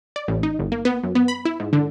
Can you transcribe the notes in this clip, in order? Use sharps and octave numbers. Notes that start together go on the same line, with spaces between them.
D5
A1
D#4
G1
A#3
B3
F#2
B3
B5
E4
G#2
D3